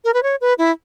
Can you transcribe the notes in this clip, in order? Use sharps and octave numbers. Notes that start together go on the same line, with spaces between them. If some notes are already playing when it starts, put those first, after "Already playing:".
A#4
B4
C#5
B4
E4